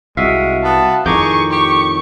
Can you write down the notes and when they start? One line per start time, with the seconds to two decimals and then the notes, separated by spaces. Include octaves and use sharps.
0.17 C2 G#3 F#4 E5 F5
0.64 B3 A5
1.06 F2 A2 D#3 G#4 A#5 C#6 D6 G6
1.52 G4 C#6